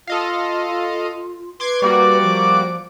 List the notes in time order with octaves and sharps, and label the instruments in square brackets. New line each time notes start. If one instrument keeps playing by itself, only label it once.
[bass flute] F4 [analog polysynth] A4 D#5 F5
[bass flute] B4 [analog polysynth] C6 D6 G#6
[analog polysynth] G3 A#3 F#4 [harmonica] D5 D6
[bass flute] F3